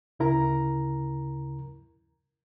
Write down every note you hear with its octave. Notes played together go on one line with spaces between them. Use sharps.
D2 C#3 E4 A#4 A#5